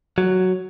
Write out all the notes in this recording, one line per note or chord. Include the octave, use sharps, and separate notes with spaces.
F#3